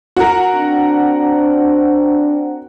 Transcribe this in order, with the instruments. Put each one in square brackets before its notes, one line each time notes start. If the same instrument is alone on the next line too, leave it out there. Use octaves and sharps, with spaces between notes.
[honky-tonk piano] F#4 A#4
[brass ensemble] C4 D4